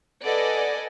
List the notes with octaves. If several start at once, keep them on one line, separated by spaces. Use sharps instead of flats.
A4 B4 D5 D#5 F#5 G#5